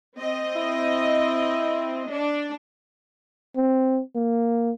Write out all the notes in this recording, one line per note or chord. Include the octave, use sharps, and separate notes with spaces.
C4 D#5
E4
D4
C4
A#3